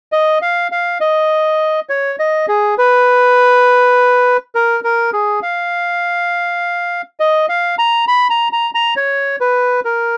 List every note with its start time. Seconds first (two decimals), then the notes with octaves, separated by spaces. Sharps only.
0.12 D#5
0.42 F5
0.72 F5
1.00 D#5
1.89 C#5
2.19 D#5
2.48 G#4
2.78 B4
4.55 A#4
4.84 A#4
5.13 G#4
5.43 F5
7.20 D#5
7.49 F5
7.79 A#5
8.08 B5
8.30 A#5
8.53 A#5
8.74 A#5
8.96 C#5
9.40 B4
9.85 A#4